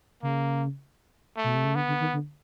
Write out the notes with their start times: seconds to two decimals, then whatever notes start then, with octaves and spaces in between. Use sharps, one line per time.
0.23 C#3 A#3
1.37 A3
1.44 B2
1.55 C3
1.65 C#3
1.75 D3 B3
1.88 D3
2.00 D#3
2.13 D3